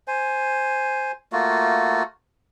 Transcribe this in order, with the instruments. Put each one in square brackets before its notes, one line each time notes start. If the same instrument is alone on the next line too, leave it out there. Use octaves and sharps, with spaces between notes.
[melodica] C5 G#5
A3 A#3 F4 F#4